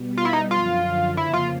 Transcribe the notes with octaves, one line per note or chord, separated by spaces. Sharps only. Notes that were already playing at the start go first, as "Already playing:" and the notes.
Already playing: B2 G3 B3
F4
E4
D#4
F#2 D3 F3 F4
F2 C#3 F3 A#3 E4
F4